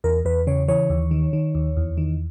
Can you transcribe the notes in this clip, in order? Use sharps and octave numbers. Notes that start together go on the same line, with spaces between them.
E2 A#4
E2 B4
C#3 C#5
E3 C#5
D#2
D#3
D#3
D#2
E2
D#3